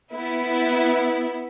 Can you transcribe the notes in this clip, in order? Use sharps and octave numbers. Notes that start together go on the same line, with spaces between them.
B3 E4